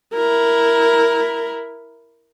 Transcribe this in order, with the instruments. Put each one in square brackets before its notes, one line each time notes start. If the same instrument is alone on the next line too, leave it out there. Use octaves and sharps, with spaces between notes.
[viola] E4 A#4